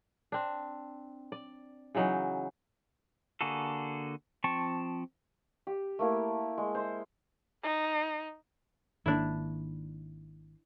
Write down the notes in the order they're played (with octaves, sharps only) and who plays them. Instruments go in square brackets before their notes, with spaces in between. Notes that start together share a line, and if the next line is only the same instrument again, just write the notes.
[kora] C4 D4
D5
C#3 E3 F#3 D#4
[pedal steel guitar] D3 A#3 F#4 G#4 A4
F3 C4 G5 A5 C#6
[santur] G4
A3 A#3 E4
G#3
C5 E5
[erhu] D#4
[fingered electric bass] G#1 D#3 A#3 [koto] D4 E4